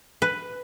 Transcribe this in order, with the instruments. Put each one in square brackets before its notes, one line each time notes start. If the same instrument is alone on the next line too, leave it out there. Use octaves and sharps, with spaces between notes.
[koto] B4